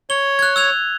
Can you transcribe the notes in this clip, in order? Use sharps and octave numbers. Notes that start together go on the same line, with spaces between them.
C#5 G7
F#6 G#6
E6 G#6 F7